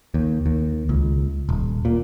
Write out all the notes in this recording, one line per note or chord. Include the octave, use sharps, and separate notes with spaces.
D#2
D#2
C#2
D#1
A#2